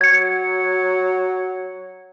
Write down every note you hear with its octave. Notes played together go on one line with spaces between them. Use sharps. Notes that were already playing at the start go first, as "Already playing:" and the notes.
F#3 G#6 C#7